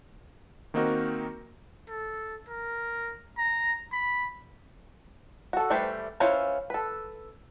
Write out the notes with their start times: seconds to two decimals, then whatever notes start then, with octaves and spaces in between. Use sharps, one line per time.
0.74 D#3 A#3 C4 D#4 F#4 A#4
1.88 A4
2.48 A#4
3.38 A#5
3.92 B5
5.53 F#4 A4
5.70 E3 G3 A3 B4 C5
6.20 C#4 E4 F4 B4 C5
6.70 A4 B4